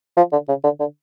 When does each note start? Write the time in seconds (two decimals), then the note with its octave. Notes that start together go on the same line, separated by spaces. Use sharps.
0.17 F3
0.32 D3
0.48 C#3
0.64 D3
0.80 D3